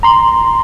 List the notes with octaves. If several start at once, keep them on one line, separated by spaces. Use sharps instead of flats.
A#5 C6